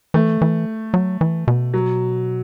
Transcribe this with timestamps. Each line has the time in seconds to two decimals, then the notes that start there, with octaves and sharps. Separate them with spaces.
0.14 E3 A3
0.42 E3
0.94 F#3
1.21 E3
1.48 B2
1.74 F#3